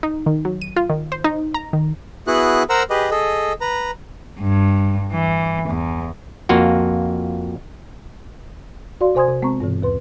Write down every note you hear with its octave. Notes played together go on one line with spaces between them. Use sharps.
D#4
D#3
F#3
D#7
F4
D#3
C5
D#4
A#5
D#3
B3 E4 F#4 G#4 F#6
A#4 C5 F#5 A#5 E6
G4 G#4 B4 D#5
G#4 A4 D#5
B4 A#5
G2
E3
E2
F2 A#3 F4 F#4
F#4 D5 F5 C6
C3 C5 G#5 C6 D#6 G#6
C3
G#3 B3 C4 A#5 C#6
G2 B2 E3
D#2 B4 C6